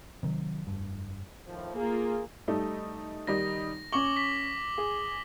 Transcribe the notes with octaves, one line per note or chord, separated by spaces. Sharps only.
C3 D#3 F3 F#3
F1 G2
A2 D#3 F3
A#3 F4 G#4
G3 A3 D#4
D#3 G3 D#4 A#6
C#4 C#6 D6 F#7 G7
B6
G#4